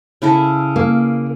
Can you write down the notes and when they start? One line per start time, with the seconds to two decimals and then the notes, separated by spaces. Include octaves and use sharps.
0.22 C#3 E4 A4
0.76 A#3